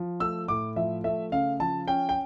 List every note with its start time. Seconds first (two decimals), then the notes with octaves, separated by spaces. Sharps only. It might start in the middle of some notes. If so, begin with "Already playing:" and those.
Already playing: F3
0.20 A3 E6
0.48 A2 D6
0.76 F3 E5
1.04 A3 E5
1.32 C#3 F5
1.60 F3 A5
1.88 C#4 G5
2.09 G5